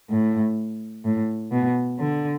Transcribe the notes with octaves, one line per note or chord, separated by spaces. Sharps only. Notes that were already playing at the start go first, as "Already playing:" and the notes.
A2
A2
B2
D3